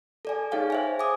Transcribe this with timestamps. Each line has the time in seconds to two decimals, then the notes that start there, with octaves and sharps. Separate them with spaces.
0.25 A4 D5 G#5
0.52 D#4 G#4 C#5 F5 G5
0.70 C5 E5 G#5
0.99 G#5 D6 D#6